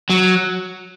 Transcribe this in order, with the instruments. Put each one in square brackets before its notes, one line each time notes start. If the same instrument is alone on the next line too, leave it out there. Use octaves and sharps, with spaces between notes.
[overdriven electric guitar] F#3